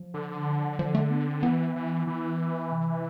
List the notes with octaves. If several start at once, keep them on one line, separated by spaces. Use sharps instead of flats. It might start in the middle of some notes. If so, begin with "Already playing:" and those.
Already playing: F3
D3
F3
A3
B3
C4
E3 B3
E3
E3
C3